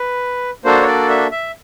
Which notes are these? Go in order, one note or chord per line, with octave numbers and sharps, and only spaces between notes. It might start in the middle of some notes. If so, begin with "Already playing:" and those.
Already playing: B4
A#3 D4 F#4 A4 C5
C#5
D5
E5
E5